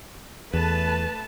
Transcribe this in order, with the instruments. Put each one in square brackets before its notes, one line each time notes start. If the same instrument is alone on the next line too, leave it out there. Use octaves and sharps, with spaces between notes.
[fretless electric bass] E2 [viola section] A3 B4 A5